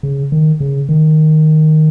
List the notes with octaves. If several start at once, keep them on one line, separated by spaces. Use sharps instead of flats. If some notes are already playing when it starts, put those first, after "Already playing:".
C#3
D#3
C#3
D#3